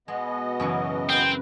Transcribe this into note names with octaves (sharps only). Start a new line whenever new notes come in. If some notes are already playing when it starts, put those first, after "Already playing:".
B2 G#3 B3 D#5
F#2 C#3 E3
C4 A#4 B4 G5